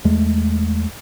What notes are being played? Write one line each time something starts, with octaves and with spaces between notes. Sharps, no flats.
E2 G#3 A3